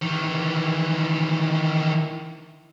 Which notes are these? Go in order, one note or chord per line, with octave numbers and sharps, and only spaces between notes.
D#3 E3